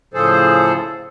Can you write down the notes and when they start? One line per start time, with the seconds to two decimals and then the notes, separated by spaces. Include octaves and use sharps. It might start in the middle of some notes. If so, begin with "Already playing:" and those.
0.14 A2 C#3 F3 G#4 A4 C5